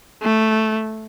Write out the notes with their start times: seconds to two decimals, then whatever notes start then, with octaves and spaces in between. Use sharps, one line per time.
0.22 A3